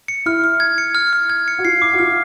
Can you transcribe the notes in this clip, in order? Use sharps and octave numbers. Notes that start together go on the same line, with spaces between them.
C#7
E4 F6
F6
G#6
C#7
F6
F6
G#6
C#7
F#4
F4 C7
E4 D6
F#4
F4 F6